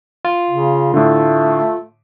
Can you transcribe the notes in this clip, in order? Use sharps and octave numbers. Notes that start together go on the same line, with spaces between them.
F4
C#3
A2 D3 A3